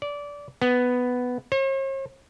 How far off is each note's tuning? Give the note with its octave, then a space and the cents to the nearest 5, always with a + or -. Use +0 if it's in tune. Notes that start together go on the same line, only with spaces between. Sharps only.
D5 -20
B3 +5
C#5 -45